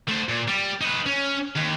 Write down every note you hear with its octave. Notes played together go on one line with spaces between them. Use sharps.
A3 C5
A#2
G3
D#4 B4
C#4
D#2